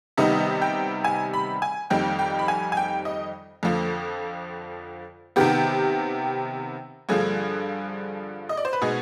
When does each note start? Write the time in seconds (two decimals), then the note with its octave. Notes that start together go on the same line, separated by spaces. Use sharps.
0.17 C3 D#3 G3 B3 D#4 D#5
0.62 G5
1.04 G#5
1.34 B5
1.62 G#5
1.90 F2 D#3 G3 C4 D#4 G5
2.19 G5
2.39 B5
2.48 G#5
2.72 G#5
2.77 G5
3.05 D#5
3.63 F2 D3 F3
5.36 C3 D#3 B3 G4
7.09 G2 D3 F3 G#4
8.49 D#5
8.57 D5
8.65 C5
8.73 B4
8.82 B2 G#3 B3 D#4 G#4